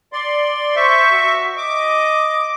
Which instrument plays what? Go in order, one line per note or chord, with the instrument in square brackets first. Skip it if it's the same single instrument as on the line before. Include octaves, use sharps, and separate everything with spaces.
[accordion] D5 C6
[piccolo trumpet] C5 [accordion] E5 C#6
[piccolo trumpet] F#4
[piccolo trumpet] D#5 [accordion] D6